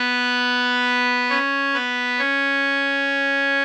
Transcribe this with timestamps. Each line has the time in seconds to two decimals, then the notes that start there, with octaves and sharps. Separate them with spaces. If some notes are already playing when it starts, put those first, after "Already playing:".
Already playing: B3 B4
1.30 C#4 C#5
1.74 B3 B4
2.19 C#4 C#5